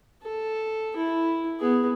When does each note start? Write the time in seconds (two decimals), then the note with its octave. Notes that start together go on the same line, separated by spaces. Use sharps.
0.22 A4
0.96 E4
1.59 B3 G#4